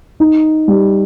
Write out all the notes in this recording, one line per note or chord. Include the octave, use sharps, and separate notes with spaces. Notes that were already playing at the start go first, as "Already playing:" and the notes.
D#4
G3